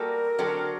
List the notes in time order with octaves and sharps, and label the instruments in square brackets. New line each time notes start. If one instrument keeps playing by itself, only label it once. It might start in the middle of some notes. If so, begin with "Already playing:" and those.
Already playing: [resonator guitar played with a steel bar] G3 A#3 F#4 A4 [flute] A#4
[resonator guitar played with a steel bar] D3 F#3 C4 F#4 A4